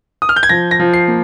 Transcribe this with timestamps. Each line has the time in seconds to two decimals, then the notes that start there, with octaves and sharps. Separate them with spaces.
0.22 D#6
0.29 F6
0.36 G6
0.43 G#6
0.49 F3 A#6
0.71 A#6
0.80 F3
0.93 C7
1.08 A#3